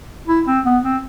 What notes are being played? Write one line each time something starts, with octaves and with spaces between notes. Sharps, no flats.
E4
C4
B3
C4